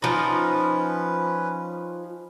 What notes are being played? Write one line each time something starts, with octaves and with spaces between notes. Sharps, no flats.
F3 C#4 D#4 B4